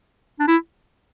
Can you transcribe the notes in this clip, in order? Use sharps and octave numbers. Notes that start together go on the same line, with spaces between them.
D4
E4